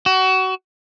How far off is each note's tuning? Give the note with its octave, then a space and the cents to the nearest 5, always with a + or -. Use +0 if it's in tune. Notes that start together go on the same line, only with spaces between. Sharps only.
F#4 +25